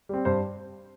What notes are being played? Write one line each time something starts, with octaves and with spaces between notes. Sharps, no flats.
G3 C4
G2 C5